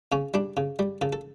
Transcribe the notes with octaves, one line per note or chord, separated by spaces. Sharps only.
C#3 C#4
G3 D4
C#3
G3
C#3 A4
A4